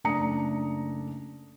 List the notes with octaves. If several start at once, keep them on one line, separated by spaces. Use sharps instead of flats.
F#1 A3 D4 A#5 D#6 C#7